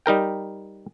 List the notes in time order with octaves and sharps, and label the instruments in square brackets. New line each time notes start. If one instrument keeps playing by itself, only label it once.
[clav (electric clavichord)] G3 D#4 A#4 G5